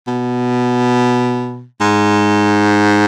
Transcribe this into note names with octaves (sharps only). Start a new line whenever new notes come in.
B2
G#2